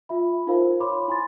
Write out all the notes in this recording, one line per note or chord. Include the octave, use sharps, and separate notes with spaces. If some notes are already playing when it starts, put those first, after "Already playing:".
F4 E5 B5
D#4 F4 A#4 C5 F5
C#5 B5 C6 D6
E4 G#5 C6 A6